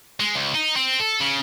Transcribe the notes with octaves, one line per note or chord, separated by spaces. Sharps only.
G#3
C#2
D#4
C4
A4
C#3